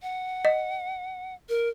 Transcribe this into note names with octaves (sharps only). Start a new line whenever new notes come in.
F#5
D#5
A#4